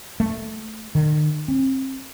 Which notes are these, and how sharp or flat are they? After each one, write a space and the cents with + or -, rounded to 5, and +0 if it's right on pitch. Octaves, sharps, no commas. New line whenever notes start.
A3 -5
D#3 -45
C4 +30